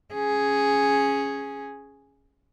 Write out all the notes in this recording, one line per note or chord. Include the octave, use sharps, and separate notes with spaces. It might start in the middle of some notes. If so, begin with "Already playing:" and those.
C#4 G#4